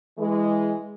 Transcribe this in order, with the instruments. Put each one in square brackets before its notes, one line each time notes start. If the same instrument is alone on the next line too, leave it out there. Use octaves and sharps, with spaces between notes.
[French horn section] E3 G#3